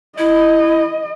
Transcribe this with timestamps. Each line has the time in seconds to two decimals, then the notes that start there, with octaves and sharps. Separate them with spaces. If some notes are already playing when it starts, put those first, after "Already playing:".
0.18 E4 D#5